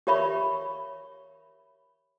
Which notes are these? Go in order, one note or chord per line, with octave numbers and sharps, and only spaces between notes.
G4 A#4 C#5 E5 B5 C#6